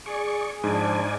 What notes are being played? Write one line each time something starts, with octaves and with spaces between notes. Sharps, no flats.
G#4 D5 C#6
G#2 F3 D4 D5 G#5